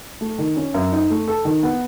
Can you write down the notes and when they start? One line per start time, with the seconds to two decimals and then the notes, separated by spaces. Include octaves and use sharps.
0.21 A3
0.38 D#3
0.57 C#4
0.74 F#2
0.92 D#4
1.10 A3
1.28 A4
1.45 D#3
1.63 B3